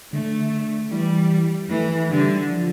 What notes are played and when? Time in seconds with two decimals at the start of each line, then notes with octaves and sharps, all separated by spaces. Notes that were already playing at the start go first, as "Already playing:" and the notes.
0.13 D3 A3
0.52 D3
0.92 E3 G3
1.70 E3 A3
2.10 D3 G3
2.50 F3